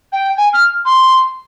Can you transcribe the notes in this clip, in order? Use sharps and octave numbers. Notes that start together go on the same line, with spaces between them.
G5
G#5
F6
C6